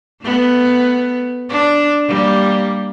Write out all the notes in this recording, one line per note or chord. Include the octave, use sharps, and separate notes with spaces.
A3 B3
D4
G3 A#3